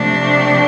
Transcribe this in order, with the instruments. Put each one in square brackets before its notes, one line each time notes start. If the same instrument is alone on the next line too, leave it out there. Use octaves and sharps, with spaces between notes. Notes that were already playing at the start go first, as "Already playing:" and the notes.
Already playing: [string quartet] C3 F3 A3 D4